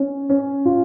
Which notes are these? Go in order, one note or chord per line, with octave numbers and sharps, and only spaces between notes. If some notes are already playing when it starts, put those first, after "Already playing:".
Already playing: C#4
C#4
F4